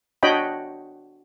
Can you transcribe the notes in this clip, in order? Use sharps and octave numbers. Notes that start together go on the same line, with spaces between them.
D4 F#4 C#5 D#5 G5 B5